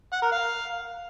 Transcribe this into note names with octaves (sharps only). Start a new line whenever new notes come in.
F#5
A#4
F5